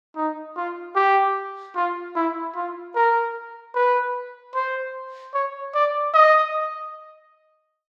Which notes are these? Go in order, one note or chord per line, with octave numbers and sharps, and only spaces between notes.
D#4
F4
G4
F4
E4
F4
A#4
B4
C5
C#5
D5
D#5